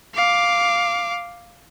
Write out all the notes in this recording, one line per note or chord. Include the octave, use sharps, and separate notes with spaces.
F5 D6